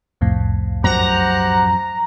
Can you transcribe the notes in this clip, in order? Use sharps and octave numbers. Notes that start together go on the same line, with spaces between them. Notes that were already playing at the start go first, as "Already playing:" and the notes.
C2 F2 A2
F#2 F3 F#3 G4 C5 F#5 A#5